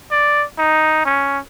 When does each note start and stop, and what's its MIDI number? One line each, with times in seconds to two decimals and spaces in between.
0.11 0.45 74
0.58 1.04 63
1.05 1.39 61